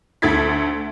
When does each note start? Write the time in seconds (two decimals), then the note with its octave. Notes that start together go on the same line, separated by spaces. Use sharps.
0.22 D2 A4 E5 G#6 A6 B6